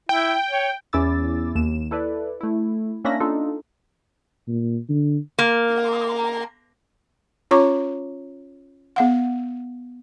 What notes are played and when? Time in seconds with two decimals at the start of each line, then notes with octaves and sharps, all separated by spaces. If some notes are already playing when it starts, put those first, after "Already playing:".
0.09 E4 G5
0.50 C#5
0.93 E2 C#4 E4 D6 E6 A6
1.55 D#2 E7
1.91 E4 A4 B4 D5
2.41 A3 E4
3.05 A#3 C#4 D4 E5 B5 A#6
3.20 D4 D#4 F4 A4
4.48 A#2
4.89 D3
5.39 A#3
7.51 C#4 F4 C#5 A#5 C#6 D6
8.96 B3 F5 F#5